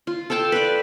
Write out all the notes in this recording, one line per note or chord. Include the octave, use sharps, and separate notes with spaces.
F4
A4 F5 G5 A5
B4 D5